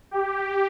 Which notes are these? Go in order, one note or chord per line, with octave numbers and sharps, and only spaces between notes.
G4